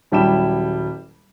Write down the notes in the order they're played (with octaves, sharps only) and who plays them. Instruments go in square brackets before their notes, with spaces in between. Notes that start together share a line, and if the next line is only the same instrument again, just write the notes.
[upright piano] D#1 F#3 G3 E4 G5 E7